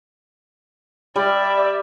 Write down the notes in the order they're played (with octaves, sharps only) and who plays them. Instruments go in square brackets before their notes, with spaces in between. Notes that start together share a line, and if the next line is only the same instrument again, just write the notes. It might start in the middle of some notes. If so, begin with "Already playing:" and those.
[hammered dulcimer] G3 [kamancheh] D5 E5